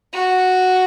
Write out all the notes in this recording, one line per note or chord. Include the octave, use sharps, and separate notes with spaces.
F#4